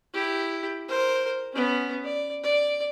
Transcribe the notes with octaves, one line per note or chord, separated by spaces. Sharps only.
E4 G4
A#4 C5
B3 C#4
D5
D5